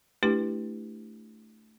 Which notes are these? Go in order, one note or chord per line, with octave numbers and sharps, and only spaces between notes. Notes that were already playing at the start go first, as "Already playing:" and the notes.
A3 D4 E4 G4 B4